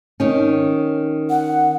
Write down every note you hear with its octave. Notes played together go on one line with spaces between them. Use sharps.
D#3 C#4
F#5